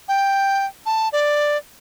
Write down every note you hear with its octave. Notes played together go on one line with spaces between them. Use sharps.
G5
A5
D5